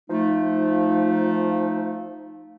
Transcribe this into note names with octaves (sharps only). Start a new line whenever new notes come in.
F3 A3 D#4